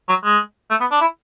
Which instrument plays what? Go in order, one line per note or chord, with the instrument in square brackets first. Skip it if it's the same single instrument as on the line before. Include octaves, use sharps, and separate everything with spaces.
[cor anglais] F#3
G#3
A3
B3
D4
E4